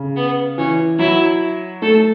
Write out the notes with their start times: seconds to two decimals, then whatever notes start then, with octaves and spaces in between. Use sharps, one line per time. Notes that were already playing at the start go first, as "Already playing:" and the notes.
Already playing: C#3
0.16 B3
0.58 E3 C#4
0.99 F#3 E4
1.82 A3 A4